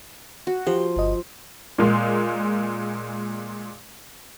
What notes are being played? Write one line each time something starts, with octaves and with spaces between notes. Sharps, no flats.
F#4
F3 G4
G1 D#5
A#2 G#3 C6